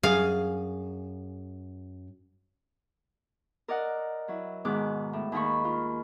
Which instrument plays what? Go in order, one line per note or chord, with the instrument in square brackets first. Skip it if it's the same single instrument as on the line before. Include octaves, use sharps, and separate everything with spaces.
[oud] F#2 G#4 [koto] F5
[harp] A#4 D5 D#5 F#5
F#3 E4
G#2 B2 D#3 D6 F#6
A2
D#2 D#3 A#3 B5 C#6
F4